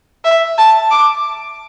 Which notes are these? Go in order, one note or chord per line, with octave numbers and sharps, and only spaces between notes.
E5
A5
D6